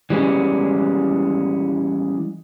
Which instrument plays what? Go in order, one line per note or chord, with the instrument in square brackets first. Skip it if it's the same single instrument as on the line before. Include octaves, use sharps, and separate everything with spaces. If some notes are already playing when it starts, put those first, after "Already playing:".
[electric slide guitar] E3 G3 G#3 C#4